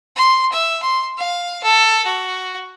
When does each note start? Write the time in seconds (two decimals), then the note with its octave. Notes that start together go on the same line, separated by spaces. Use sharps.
0.16 C6
0.52 E5
0.83 C6
1.18 F5
1.63 A4
2.05 F#4